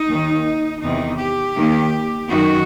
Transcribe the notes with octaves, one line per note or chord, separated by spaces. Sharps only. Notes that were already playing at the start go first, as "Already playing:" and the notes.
Already playing: D#4
D#2 D#3
E2 C3 D#3 D#4
G4
D#2 D#3
F#2 D#3 F#4